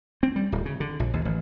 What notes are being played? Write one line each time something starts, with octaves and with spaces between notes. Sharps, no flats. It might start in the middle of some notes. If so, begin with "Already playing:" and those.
C4
G3
D1
C#3
D3
A#1
D#2
A1